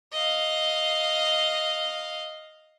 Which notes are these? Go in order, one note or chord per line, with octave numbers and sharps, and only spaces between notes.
D#5 F5